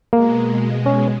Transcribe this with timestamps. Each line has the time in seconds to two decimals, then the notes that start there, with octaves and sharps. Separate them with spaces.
0.13 B2 G#3 A#3
0.86 C#4